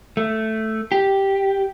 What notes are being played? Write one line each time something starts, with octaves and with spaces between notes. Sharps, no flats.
A3
G4